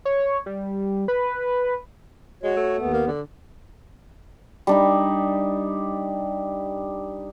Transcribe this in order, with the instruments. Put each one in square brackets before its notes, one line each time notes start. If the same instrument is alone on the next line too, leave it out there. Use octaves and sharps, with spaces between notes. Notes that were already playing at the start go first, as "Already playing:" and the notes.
[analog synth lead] C#5
G3
B4
[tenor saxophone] G#3 [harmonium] F#4 C#5
[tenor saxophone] A3
[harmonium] D#2 B3
[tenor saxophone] A#3
D3
[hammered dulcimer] G3 D4 D#4